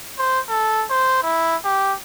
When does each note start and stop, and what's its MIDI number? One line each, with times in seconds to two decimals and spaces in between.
0.18 0.40 72
0.49 0.85 69
0.90 1.21 72
1.23 1.56 64
1.64 1.93 67